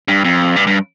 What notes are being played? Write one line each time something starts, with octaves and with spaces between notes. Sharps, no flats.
G2
F2
G2
G2